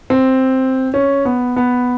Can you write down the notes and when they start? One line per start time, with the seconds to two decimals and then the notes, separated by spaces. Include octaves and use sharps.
0.10 C4
0.94 C#4
1.25 B3
1.56 B3